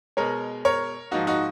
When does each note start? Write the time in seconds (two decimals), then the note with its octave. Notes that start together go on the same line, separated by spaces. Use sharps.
0.17 B2 G#3 A#4 C#5
0.65 A#4 C#5
1.11 G#2 F3 A#3 D#4 F#4
1.27 D#4 F#4